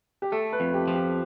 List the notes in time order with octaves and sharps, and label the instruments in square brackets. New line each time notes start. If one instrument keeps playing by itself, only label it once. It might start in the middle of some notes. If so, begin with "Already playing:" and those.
[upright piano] G4
[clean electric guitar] A3 [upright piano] A4
[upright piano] B4
[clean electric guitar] F2
[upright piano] G4
[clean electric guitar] F3
[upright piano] G4